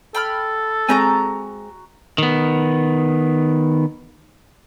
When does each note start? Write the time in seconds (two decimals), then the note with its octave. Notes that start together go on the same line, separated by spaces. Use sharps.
0.15 A4 G5 B5 F6
0.89 G#3 C4 F#4 G#5 A#5 G6
2.18 D#3 B3